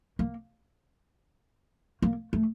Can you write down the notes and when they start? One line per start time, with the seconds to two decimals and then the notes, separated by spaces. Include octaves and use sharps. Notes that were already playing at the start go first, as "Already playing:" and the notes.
0.19 A#3
2.02 A#3
2.33 A3